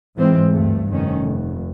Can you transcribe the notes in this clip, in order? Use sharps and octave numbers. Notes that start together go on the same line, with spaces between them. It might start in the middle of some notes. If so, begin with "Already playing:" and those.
G#2 E3 G#3 C4
D2 G2 A3
F1 D#3 C#4
F1